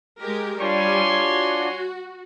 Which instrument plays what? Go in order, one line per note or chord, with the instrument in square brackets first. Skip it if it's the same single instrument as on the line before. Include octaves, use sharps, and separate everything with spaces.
[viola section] G#3 G4 A#4
[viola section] G3 [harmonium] D4 F4 D5 [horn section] C#5 G#5 C6
[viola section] F#4